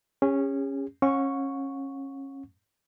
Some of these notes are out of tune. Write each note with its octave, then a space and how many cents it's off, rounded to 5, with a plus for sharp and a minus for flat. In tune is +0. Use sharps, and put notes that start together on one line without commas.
C#4 -5 G#4 -45
C#4 -25 F#5 -40 C#6 +0